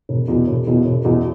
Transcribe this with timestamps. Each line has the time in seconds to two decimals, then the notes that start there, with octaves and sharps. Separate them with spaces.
0.09 E1
0.28 E2 B2
0.47 E1
0.67 E2 B2
0.86 E1
1.05 E2 B2